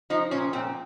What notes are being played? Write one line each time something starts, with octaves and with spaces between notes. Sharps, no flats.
F3 D#4
A#2 C#4
A#2 C4